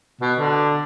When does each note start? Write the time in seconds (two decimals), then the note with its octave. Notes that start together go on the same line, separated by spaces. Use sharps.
0.21 B2
0.38 D3